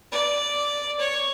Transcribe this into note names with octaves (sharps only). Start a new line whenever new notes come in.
D5
C#5